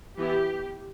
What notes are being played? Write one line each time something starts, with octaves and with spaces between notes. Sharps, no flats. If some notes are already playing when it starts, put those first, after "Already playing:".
E3 B3 E4 G4